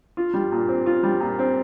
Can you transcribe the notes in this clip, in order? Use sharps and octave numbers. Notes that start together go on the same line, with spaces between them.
F4
G3
A#2
C4
F4
G3
A#2
C4